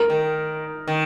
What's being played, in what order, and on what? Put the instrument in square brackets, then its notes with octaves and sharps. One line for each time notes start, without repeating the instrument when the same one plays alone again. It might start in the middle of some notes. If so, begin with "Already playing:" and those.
Already playing: [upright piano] A#4
[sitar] D#3
D#3